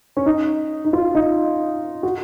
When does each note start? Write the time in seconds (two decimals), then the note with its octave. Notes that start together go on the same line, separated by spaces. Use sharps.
0.17 C#4
0.26 D#4
0.85 D#4
0.93 F4
1.15 D#4
2.03 F#4